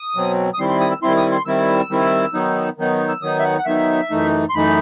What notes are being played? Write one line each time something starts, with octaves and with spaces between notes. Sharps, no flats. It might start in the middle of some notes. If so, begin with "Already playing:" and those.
Already playing: D#6
B2 F#3 C4
D#6
D#3 G3 C4 E4 C6
C6
D#6
E6
D#3 G3 C4 E4 C6
D#6
C6
D#3 G3 C4 E4 E6
D#3 G3 C4 E4
D#3 F#3 B3 D#4
D#3 F#3 B3 D#4
E6
D#3 F#3 B3 D#4 D#6
E5
F#5
F#5
D#3 F#3 B3 D#4 E5
F#2 E3 A3 D#4
C6
F#2 E3 A3 D#4 B5